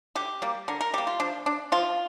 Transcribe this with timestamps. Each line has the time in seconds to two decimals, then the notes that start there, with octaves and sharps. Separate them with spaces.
0.15 D3 G4
0.42 G3 A#3
0.68 D3 A#4
0.81 A#4
0.94 G3 A#3 G4
1.07 F4
1.20 F3 D4
1.46 D4
1.72 F3 F4